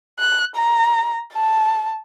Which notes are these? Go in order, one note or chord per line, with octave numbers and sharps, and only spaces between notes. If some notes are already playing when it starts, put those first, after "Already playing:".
F#6
A#5
A5